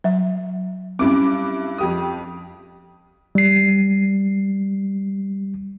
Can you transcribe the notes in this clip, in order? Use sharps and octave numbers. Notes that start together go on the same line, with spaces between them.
F#3 E5
G2 C4 C#4 E4 D6
F2 G4 D#6
G3 C7